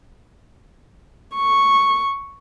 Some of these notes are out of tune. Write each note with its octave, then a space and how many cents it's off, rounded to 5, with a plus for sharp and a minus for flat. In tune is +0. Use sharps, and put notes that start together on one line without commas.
C#6 -5